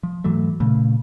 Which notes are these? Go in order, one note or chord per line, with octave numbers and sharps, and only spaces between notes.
F3
G#2 E3 F#3 A3
A#2 C#3 A3